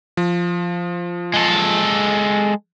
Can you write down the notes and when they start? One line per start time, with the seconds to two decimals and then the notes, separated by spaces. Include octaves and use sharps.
0.17 F3
1.34 G#3 A4